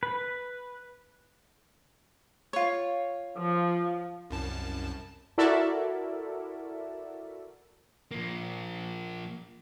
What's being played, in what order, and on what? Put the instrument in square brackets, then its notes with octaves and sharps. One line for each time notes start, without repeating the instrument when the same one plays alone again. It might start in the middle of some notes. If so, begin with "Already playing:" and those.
[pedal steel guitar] B4
[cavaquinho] F4 C#5
[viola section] F3
[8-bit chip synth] C2 F#2 A5
[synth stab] E4 F#4 A4 A#4 D5 E5
[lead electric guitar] F3 A#3